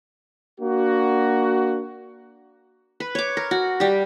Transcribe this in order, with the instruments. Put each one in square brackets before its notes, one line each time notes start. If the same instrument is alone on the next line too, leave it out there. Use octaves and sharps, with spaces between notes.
[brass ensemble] A#3 D4 F#4
[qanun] B4
C#5 D6
A#4
F#4
G3 G4